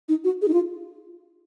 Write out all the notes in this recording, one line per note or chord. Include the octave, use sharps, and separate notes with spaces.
D#4
F#4
G#4
D#4
F4